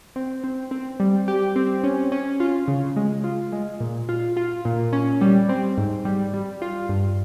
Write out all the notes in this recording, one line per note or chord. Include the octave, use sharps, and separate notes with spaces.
C4
C4
C4
G3
G4
C4
C#4
C#4
F4
C#3
G#3
F4
G#3
A#2
F4
F4
A#2
C#4
G3
C4
G#2
G3
G3
F4
G2